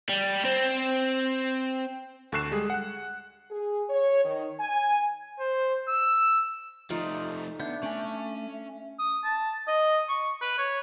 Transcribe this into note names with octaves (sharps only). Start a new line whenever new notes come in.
G3
C4
D2 A4 C#6 F#6 C7 E7
G3 G#3 G#4
F#5 F#6
G#4
C#5
D#3
G#5
C5
E6
F3 A3 D#4 F4 D5
B3 D4 E5 G6
A3 C#4 D5 G#5
D#6
A5
D#5
C#6
B4
C#5